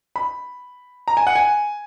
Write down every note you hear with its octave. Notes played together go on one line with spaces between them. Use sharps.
B5
A#5
G#5
F#5
G#5